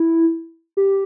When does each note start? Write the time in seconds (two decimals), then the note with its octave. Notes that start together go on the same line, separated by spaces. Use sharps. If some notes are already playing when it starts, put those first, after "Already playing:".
Already playing: E4
0.77 G4